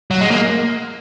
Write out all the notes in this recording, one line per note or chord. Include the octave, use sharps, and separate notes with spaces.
F#3
G#3
A#3